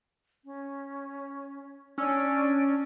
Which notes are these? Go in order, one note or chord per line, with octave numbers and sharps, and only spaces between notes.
C#4
C#4 D4 E6